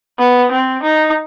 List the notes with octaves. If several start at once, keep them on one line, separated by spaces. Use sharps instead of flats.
B3
C4
D#4